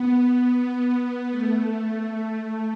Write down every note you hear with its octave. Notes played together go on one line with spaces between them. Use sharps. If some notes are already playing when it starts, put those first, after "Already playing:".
Already playing: B3
A3